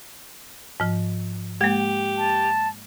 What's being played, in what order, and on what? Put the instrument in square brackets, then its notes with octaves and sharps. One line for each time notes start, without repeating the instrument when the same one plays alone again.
[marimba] G#2 F3
[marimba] G#3 A#3 [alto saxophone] G4
[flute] A5